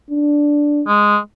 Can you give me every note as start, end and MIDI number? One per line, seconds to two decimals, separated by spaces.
0.11 0.85 62
0.87 1.18 56